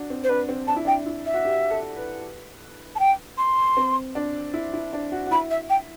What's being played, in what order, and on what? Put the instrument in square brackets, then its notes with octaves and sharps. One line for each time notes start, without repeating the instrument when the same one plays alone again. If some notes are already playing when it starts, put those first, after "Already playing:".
Already playing: [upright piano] D4 F#4
C4
[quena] C5
[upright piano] D4 [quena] B4
[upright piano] C4
[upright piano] D4 [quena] A5
[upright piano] E4
[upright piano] D4 [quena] G5
[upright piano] E4
[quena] E5
[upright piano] F#4
G4
A4
B4
[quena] A5
G5
C6
[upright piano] C4
D4
E4
E4
D4
F#4
F#4
[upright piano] E4 [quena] B5
[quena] E5
G5